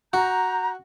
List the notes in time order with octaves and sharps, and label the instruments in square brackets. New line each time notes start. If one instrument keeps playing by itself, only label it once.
[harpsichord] F#4 [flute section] A#5 G6